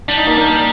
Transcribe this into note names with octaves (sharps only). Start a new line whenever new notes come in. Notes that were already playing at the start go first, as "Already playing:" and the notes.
G3 D4
D#4
A#3 D4
A#3 D4